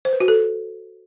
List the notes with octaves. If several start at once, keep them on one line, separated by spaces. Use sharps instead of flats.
C5
B4
F#4
A4